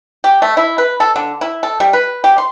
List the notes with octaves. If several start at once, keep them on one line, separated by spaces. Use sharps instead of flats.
G4
A3
E4
B4
A4
D3
E4
A4
G3
B4
G4
C6